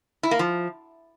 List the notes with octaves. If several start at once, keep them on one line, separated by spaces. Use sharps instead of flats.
E4
A#3
F3